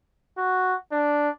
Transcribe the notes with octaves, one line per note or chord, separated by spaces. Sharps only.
F#4
D4